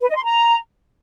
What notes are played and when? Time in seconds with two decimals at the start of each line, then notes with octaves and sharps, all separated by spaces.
0.01 B4
0.09 D#5
0.16 C6
0.24 A#5